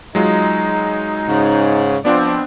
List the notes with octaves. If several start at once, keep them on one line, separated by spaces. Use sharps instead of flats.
F#3 G#3 D#4 F4
G#2 C#3
B2 F3 B3 C4 D4 D5